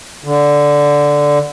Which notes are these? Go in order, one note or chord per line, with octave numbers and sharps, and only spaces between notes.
D3